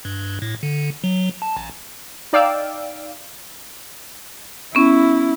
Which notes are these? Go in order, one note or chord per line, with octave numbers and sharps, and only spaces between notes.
G2
A2
D3
F#3
A5
A1
D#4 D5 F5 G5 E6 D7
B3 C#4 E4